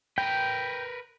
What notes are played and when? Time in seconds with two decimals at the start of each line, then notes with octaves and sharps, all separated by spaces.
0.18 A#4 B4 G5